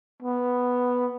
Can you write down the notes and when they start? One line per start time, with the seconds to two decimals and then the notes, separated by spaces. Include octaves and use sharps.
0.22 B3